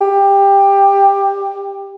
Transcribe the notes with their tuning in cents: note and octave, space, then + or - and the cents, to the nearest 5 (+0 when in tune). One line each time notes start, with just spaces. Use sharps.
G4 +15